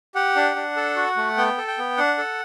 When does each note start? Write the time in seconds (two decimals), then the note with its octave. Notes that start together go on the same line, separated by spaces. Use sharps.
0.15 G4 F#5
0.36 D4
0.56 D4
0.77 A4
0.96 F#4
1.17 A3
1.37 B3 G5
1.58 A4
1.68 G5
1.78 B3
1.97 D4 F#5
2.18 A4